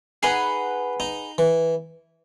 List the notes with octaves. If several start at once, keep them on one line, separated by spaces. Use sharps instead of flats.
D#4 G#4 B4 F#5
D#4
E3